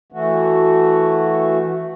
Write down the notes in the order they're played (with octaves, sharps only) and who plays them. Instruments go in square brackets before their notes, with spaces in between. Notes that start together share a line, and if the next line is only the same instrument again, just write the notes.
[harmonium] E3 A3 F#4